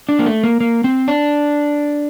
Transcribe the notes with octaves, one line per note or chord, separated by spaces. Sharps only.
D4
A#3
A3
A#3
A#3
C4
D4